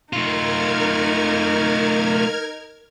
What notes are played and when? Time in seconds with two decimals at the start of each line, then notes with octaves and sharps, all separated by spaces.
0.13 A3 D#4 F4 A#4 F6 G#6